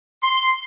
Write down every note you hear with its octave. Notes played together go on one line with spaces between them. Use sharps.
C6